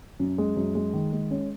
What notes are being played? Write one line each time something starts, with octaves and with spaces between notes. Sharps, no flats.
F#2
G#3
F#2
G#3
D#3
G#3
C#4